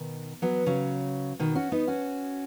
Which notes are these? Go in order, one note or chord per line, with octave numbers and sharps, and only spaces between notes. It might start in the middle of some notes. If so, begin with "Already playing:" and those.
Already playing: B2 D#3
F#3 B3
C#3 F#3
B2 D#3
C#4 F#4
B3 D#4
C#4 F#4